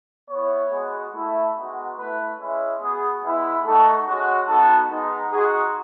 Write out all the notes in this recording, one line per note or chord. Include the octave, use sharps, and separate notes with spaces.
B3 E4 C#5
G#3 B3 F#4
A3 E4
G#3 B3 D#4 F#4
A3 E4 B4
G#3 C#4 E4
B3 F#4 G#4
G#3 B3 E4
A3 D#4 F#4 A4
G#3 C#4 F#4
B3 D#4 F#4 A4
G#3 B3 D#4
G#3 D#4 F#4 G#4